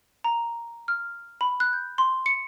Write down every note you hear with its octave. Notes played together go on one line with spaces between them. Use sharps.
A#5
F6
B5
F#6
G6
C6
C#7